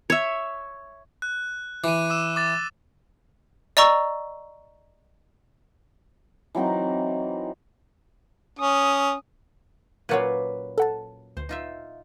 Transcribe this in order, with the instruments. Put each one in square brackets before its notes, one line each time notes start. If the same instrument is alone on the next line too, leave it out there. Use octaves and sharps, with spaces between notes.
[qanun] C#5 E5
[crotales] F#6
[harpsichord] E3 [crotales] D6 D#7
[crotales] D6 E6 E7
D6 A6
[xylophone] D5 D#5 A#5 C#6 E6
[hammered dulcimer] E3 F#3 C4 D#4
[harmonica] C#4 [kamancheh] D#6
[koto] A#2 F#3 C#4 [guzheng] B4 D5 F5
[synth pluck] A4 F#5 A5
[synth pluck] D2 [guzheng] C5
[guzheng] D#4 F4 E5